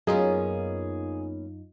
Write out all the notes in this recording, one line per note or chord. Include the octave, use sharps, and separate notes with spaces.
F#2 A#3 B3 C#4 D#4 F4 G#4